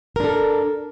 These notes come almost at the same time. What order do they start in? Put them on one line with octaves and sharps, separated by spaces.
A#4 D4 A4